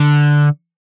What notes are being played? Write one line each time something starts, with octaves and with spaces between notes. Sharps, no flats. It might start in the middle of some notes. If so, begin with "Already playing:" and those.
Already playing: D3